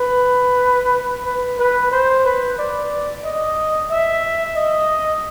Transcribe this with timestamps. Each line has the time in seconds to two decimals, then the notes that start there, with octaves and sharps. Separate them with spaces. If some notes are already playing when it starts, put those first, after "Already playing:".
Already playing: B4
1.25 B4
1.59 B4
1.92 C5
2.25 B4
2.59 D5
3.24 D#5
3.91 E5
4.56 D#5